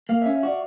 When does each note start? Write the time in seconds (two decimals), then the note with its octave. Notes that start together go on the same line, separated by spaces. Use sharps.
0.09 A#3 F5
0.22 C#4 E5
0.35 E5
0.43 F#4 D5